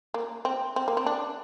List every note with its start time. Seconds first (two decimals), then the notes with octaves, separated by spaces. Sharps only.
0.14 A#3
0.45 C4
0.76 C4
0.88 A#3
0.97 C4
1.06 D4